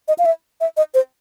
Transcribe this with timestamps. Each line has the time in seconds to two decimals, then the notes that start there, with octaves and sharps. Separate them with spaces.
0.08 D#5
0.18 F5
0.25 E5
0.61 E5
0.77 D#5
0.94 C5